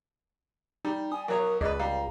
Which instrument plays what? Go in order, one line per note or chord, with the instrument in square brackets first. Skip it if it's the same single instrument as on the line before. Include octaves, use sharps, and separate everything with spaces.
[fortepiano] G3 [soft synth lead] D#4
[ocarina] G#5 [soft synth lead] D#6
[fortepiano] B1 F#3 C#5 [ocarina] A#4
[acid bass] C#2 [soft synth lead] G#4 [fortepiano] B4 D5 [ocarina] D#5
[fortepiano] G3 [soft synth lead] F5 [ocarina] A#5